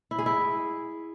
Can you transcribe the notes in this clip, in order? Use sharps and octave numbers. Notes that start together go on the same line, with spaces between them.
E4
G#4
E4